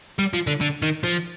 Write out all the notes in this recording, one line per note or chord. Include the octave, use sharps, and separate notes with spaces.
G3
F3
D3
D3
D#3
F3